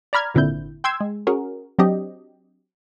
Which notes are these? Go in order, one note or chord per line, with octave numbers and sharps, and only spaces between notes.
D5 A#5 B5 F6 G#6
G#1 A#2 D3 C4 E4 G6
G5 C6 E6 G#6
G#3
C#4 F#4 G#4 A#4
F#3 C4 D4 G4 D#5